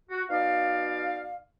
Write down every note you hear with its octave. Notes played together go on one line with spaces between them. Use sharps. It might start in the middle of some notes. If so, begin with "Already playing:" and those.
F#4
B2 D#4 D5 F5